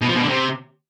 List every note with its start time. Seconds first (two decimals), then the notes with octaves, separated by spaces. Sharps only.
0.02 B2
0.08 F3
0.15 B2
0.22 D3
0.28 C3